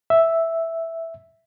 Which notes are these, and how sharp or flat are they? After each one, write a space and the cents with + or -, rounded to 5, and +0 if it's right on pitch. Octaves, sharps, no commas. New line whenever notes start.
E5 +0